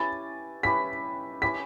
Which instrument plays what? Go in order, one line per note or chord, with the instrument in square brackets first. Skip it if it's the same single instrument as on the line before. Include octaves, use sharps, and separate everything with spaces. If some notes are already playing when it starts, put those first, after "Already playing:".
Already playing: [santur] C#4 E4 G4 B4 [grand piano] A6
[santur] C#4 E4 G4 B4 [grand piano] B6
[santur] C#4 E4 G4 B4 [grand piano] B6